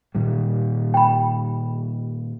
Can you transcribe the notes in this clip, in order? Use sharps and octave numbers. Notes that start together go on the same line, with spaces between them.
A#2 D#3 G3
G5 B5